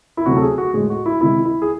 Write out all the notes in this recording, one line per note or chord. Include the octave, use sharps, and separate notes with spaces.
E4
C3 F#3 A3 F#4
A4
G#4
F#4
A2 G#3 G#4
F#4
E4
C3 D#3 G#3 E4
E4
G#4